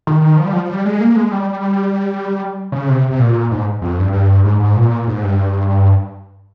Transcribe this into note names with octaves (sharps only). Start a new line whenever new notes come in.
D#3
F3
G3
F3
G3
G#3
A#3
G#3
G3
C#3
C3
C3
A#2
G#2
F2
G2
G2
G#2
G#2
A#2
G#2
G2